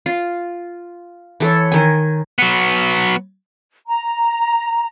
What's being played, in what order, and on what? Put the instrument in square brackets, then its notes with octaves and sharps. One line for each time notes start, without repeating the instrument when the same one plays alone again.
[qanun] F4
E3 A4 C#5
D#3 G#5
[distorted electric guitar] F#3 B3
[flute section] A#5